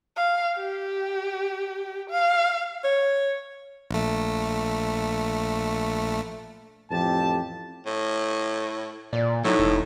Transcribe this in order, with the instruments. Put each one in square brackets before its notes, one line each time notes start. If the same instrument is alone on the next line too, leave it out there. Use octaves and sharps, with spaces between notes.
[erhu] F5
G4
F5
[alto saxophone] C#5
[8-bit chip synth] A#1 A3
[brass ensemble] A1 F2 G4 A5
[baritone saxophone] A2
[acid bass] A#2 [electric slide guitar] D5
[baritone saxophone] A2 [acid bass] F#3 [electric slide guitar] D#4 E4 A4
[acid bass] F1